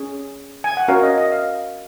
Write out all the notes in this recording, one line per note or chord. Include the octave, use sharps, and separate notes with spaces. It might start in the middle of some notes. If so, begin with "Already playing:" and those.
Already playing: C#4 G#4
G#5
F#5
C#4 F#4 A#4 C#5 F5
D#5
D#5
F5